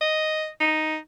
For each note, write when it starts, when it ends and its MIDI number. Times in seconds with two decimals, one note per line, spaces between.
0.01 0.48 75
0.60 0.97 63